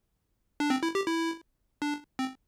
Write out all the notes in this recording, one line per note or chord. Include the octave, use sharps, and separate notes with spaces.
D4
C4
E4
G4
E4
D4
C4